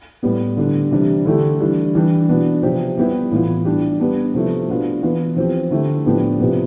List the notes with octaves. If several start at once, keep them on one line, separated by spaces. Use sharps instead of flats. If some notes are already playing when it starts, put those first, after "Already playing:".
A2 G3 B3
D3 G3 D4
C3 E3 G3 D4
D3 A3 E4 G4
E3 G3 D4
E3 G3 D4 G4
B2 B3 D4
C3 F3 C4 G4
G3 B3 E4 G4
A2 E3 B3 F4
G3 D4 G4
G3 B3 D4
C3 F3 A3 E4
B2 B3 D4 F4
E3 B3 F4
F3 C4 G4
D3 A3 E4 G4
A2 F3 B3 D4 G4
C3 F3 B3